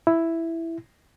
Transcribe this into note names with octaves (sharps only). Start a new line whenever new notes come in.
E4